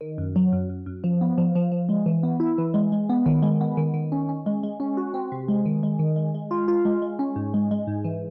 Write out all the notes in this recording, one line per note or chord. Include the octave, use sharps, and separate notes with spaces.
D#3
F#2
F#3
F#2
F#2
F#2
F3
B3
F3
F3
F3
G#3
E3
B3
E4
E3
G#3
G#3
B3
D#3
G#3
B3
D#3
D#3
C#4
C#4
G#3
G#3
C#4
F#4
C4
C3
G#3
D#3
G#3
D#3
G#3
G#3
F4
F4
G#3
G#3
C#4
G#2
G#3
G#3
G#2
E3